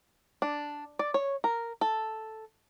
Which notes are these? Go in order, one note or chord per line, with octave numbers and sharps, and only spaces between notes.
D4
D5
C#5
A#4
A4